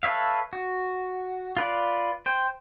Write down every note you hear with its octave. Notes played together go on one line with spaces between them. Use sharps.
A4 B4 C#5 E5 F5
F#4
F4 B4 D5
C5 G5